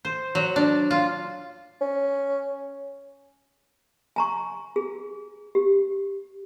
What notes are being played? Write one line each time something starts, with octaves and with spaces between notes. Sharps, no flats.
C5
F#3
D4
F4
C#4
G#5 A#5 C#6
G#4
G4